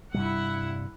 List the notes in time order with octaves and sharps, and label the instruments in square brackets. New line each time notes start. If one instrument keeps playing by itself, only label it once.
[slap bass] G2 C3 G3 [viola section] E4 F#5